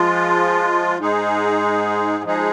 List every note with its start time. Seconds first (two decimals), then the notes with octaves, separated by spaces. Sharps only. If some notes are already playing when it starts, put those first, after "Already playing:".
Already playing: F3 G#3 F4
0.99 G#2 G#3 D#4 G#4
2.24 F3 G#3 D#4 G#4